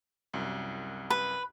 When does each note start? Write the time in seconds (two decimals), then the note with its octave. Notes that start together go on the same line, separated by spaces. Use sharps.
0.34 C2 F#2
1.10 B4